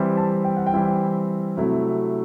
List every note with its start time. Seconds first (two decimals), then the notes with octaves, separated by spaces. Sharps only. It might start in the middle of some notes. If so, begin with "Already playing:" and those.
Already playing: E3 G3 C4 E4
0.17 A5
0.45 G5
0.57 F#5
0.67 G5
0.73 E3 G3 C4 E4
1.57 C3 F#3 A3 E4